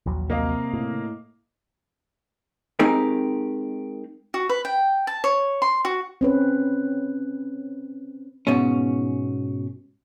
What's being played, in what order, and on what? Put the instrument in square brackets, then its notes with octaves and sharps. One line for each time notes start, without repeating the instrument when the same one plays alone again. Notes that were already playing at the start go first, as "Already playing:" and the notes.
[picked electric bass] A#1 D#2 F#3
[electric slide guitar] C3 [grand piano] A#3 D#5 F5
[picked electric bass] A2
[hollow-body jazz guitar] G#3 C4 D#4 G4 G#4 A#4
[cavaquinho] F#4
B4
G5
A5
C#5
C6
F#4
[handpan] C4 C#4 B4
[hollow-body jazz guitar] G#2 B2 C#4